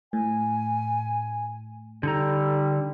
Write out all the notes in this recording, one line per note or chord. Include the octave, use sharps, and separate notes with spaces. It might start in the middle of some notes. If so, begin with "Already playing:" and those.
A2 G#5
D3 G3 D#4 A4 A#5